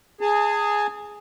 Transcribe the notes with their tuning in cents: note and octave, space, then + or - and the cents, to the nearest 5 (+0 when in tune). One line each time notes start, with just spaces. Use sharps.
G#4 +0 A5 +35